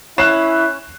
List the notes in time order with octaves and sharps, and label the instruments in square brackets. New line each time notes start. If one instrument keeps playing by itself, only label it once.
[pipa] C#4 [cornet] E4 [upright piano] F#6 C7 E7